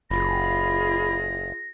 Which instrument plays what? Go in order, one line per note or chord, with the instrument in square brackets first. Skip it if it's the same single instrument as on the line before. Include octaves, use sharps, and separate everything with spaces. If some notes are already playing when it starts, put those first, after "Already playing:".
[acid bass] F#1 [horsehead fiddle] F4 G#4 [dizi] B5 [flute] A#6